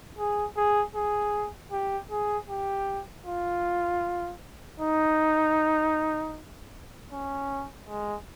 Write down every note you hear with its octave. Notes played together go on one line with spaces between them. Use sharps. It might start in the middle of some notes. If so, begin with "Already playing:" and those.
G#4
G#4
G#4
G4
G#4
G4
F4
D#4
C#4
G#3